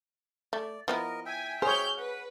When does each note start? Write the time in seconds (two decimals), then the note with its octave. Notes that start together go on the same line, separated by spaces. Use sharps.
0.53 A3 D5
0.88 F3 B3 E4 A#4 D#5
1.26 E5 G5 G#5
1.62 G#4 C5 C#5 F6 G6
1.97 B4 F#5